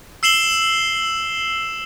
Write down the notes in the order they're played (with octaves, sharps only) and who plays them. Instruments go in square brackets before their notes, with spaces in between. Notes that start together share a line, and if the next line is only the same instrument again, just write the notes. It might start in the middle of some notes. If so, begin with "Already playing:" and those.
[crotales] E6 C7 E7 F#7 G7